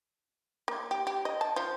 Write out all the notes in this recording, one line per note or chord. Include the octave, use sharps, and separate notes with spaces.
A#3
G4
G4
D#5
A5
F3